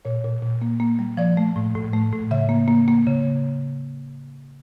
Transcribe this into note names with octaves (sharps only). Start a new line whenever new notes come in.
A#2 C#5
A#2
A#2
A#3
A#3
G3
F3 D5
A3
A2
A2
A3
A2
C#3 E5
A#3
A#3
A#3
C#3